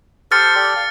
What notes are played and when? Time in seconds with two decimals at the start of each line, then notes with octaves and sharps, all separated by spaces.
0.32 G4 A4 C5 F6 A6 C#7
0.56 G4 A4 D5
0.76 F5